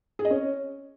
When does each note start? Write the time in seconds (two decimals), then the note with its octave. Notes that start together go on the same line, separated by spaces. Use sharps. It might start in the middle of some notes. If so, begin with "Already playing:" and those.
0.19 G#4
0.25 D#5
0.30 C#4